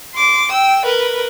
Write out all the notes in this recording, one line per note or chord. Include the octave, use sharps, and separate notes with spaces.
C6 D6
G5 E6
A#4 B4